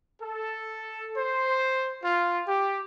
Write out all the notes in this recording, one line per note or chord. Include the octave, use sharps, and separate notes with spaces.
A4
C5
F4
G4